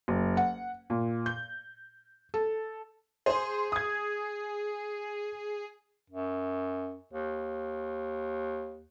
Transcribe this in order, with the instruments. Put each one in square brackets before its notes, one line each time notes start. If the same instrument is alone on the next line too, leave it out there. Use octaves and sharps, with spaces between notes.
[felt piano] F#1
F#5
A#2
G6
A4
[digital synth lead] G#4 [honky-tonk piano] C5 C6
[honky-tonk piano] D#6 G#6
[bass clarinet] F#2
D#2